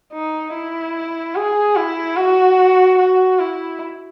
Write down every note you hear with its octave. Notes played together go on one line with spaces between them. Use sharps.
D#4
E4
G#4
E4
F#4
F#4
E4